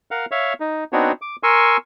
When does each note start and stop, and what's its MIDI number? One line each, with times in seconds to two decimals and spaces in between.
0.11 0.26 70
0.11 0.26 77
0.11 0.26 78
0.31 0.53 73
0.31 0.53 76
0.31 0.53 77
0.60 0.84 63
0.93 1.12 59
0.93 1.12 60
0.93 1.12 62
0.93 1.12 63
0.93 1.12 66
0.93 1.12 73
1.22 1.36 86
1.43 1.77 70
1.43 1.77 80
1.43 1.77 84
1.43 1.77 85
1.43 1.77 88